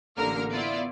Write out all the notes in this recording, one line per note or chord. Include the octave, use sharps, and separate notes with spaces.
A1 D3 A#3 A#4 F6
B3 E4 F4 D5